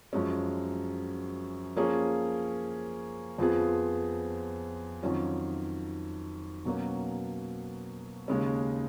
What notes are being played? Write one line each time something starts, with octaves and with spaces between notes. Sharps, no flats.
F#2 F3 G#3 C#4
F3 A#3 C#4 G#4
F2 F3 B3 F4 G#4
F2 D#3 F#3 C#4 F4
B2 F#3 A#3 C#4
D#2 C#3 G#3 C#4